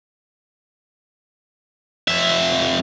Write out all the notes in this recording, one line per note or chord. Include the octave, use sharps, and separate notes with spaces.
F2 E5